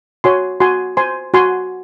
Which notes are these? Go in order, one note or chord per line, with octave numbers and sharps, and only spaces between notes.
F#4 C#5 G#5 C6
F#4 G#5 C6
C5 G#5 C6
F#4 G#5 C6